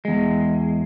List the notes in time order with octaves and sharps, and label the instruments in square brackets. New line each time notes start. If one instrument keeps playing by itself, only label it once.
[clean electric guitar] E2 G#3